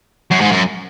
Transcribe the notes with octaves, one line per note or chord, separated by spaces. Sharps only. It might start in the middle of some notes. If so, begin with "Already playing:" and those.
F#2
G#2
F#2